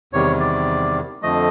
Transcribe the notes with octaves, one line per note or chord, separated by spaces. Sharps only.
E2 C3 D#3 G3 C#5
D5
F2 D3 F3 A3 D#5